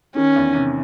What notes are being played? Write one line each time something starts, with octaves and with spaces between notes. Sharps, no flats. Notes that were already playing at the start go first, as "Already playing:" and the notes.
D#3 C#4
E2
C3